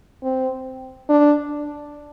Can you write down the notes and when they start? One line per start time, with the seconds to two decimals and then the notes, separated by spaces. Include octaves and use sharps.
0.23 C4
1.09 D4